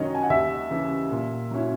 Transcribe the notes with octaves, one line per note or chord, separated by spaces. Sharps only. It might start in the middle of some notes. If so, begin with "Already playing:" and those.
Already playing: F#2 D#3 F#3 C#4 D#5
G#5
F#5
D#2 E5
C#3 E3
A#2
F#3 C#4 E4